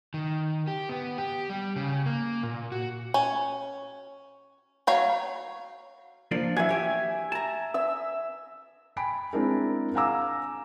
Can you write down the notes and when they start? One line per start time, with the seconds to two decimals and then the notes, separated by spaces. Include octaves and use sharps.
0.14 D#3
0.67 G4
0.89 B3
1.18 G4
1.50 G3
1.76 C#3
2.06 A#3
2.43 A#2
2.72 F#4
3.14 C#4
4.87 F#3 C#5 F5
6.31 F3 A#3 D4
6.56 E3 F#3 E5 G#5
6.69 G4 C#5
7.32 A5 A#5
7.74 E5 E6
8.96 G5 G#5 B5 D7
9.33 G#3 C4 D4 E4 G#4 A#4
9.95 F5 F#5 G#5 A#5 D6 E6